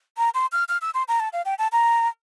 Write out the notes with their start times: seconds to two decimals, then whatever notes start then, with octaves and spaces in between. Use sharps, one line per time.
0.18 A#5
0.34 C6
0.52 F6
0.69 F6
0.82 E6
0.94 C6
1.08 A#5
1.20 A5
1.33 F5
1.45 G5
1.59 A5
1.72 A#5